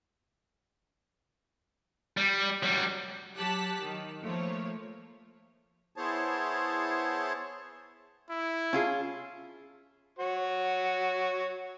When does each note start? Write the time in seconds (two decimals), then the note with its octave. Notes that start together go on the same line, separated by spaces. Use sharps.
2.17 G3
2.63 F#3 G3
3.35 F#3 G4 A5 F#6 B6
3.80 D#3
4.22 F3 A3 A#3 C#5
5.96 B3 E4 G#4 C5 C#5 A5
8.30 E4
8.73 C#4 F4 G#4
10.19 F#4 C#5